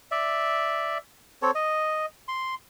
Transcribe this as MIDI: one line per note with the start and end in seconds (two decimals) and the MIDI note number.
0.11 0.98 74
0.11 0.98 76
1.42 1.51 60
1.42 1.51 69
1.42 1.51 73
1.55 2.06 75
2.28 2.55 84